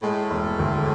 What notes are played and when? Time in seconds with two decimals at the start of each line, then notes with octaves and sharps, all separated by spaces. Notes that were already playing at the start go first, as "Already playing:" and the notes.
0.02 A2 G#3
0.31 E1
0.59 D2